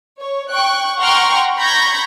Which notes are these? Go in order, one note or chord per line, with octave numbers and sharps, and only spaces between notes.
C#5
G5 C#6 F#6
F#5 G5 A#5 C6 C#6 F6
A#5 B5 C#6 G6 G#6 A#6